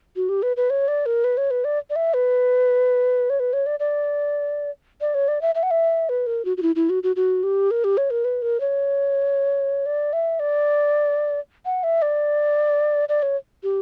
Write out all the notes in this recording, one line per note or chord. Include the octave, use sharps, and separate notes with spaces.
F#4
G4
B4
B4
C#5
D5
A#4
B4
C#5
B4
D5
D5
E5
B4
C#5
B4
C#5
D5
D5
D5
C#5
D5
E5
E5
F#5
E5
B4
A#4
F#4
F#4
E4
E4
F#4
F#4
F#4
G4
A#4
G4
C#5
A#4
B4
A#4
C#5
D5
E5
D5
F#5
E5
D5
D5
C#5
G4